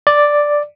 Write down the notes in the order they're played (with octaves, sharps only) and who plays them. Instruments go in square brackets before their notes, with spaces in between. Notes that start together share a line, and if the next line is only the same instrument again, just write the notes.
[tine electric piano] D5